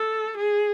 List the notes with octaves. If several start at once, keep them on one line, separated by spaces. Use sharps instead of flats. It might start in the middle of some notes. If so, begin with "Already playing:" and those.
Already playing: A4
G#4